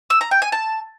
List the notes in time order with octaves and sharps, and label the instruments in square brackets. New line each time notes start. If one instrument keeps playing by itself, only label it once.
[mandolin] E6
A#5
G5
G#5
A5